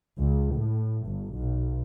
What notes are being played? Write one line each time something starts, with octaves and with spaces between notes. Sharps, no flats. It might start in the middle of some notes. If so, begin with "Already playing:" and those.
C#2
A2
G1
B1